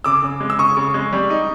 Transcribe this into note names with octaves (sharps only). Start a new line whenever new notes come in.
C#3 D6 E6
C#3
G#3
E6
C#3 C#6 D#6
C#3
G#3
G3
D#4